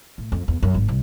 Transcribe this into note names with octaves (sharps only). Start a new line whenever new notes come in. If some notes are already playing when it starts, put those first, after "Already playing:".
A2
F2
E2
F#2
G#1
C2